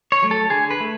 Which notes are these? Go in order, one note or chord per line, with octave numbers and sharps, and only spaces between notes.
C#5
F#3 A3
A4
D3 G#4
B4
A3